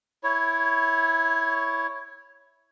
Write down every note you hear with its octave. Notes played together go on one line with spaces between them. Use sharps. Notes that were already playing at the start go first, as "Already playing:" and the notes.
E4 C#5